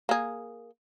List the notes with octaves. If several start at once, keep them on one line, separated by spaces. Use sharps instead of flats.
A#3 G#4